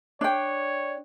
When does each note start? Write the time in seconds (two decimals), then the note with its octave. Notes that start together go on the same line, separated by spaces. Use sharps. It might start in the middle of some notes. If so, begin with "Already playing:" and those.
0.21 D4 C#5 G5